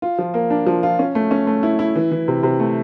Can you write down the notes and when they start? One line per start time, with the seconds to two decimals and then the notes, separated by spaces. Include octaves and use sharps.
0.02 F4
0.18 F3
0.34 A#3
0.50 D4
0.66 F3
0.83 F4
0.99 C#4
1.15 A3
1.31 C#4
1.47 A3
1.63 E4
1.79 E4
1.95 E3
2.11 E3
2.28 C3
2.43 C3
2.60 A3